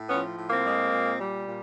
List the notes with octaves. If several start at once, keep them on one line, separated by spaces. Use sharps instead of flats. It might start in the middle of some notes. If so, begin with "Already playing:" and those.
Already playing: A2
F3 B3 C#4
A2
A#3 C4
G#3
A#2
G3
A#2